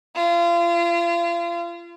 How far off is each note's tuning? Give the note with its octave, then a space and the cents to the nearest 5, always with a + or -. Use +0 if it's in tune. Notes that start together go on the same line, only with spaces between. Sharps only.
F4 -35